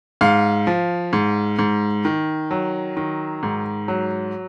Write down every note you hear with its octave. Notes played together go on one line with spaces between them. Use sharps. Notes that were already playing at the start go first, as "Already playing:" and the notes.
G#2 F5
F3
G#2
G#2
D#3
F#3
D#3
G#2
F#3